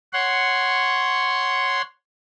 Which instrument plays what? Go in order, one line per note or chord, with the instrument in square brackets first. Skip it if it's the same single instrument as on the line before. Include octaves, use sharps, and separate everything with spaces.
[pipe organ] C#5 F#5 C6